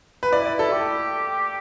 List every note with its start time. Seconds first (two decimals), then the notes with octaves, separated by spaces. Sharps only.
0.23 B4
0.32 E4 D5
0.46 D5
0.59 A4
0.72 G4